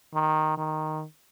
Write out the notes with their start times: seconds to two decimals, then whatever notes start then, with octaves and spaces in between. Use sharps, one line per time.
0.14 D#3
0.58 D#3